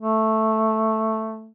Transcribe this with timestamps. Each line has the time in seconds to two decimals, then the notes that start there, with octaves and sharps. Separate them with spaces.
0.02 A3